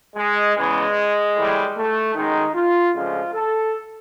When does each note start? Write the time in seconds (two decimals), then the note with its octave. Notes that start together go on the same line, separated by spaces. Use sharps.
0.16 G#3
0.55 E2 C#3 E3 G#3
1.35 A2 E3 G3
1.75 A3
2.13 F#2 D#3 G#3 D#4
2.54 F4
2.92 D2 C#3 F3 G#3 F4
3.33 A4